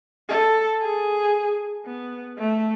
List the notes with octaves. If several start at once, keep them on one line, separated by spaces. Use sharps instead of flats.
A4
G#4
B3
A3